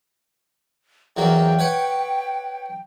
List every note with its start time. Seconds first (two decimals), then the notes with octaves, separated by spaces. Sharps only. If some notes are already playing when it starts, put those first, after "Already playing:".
1.17 E2 F#3 A#3 G5
1.59 B4 C#5 F#5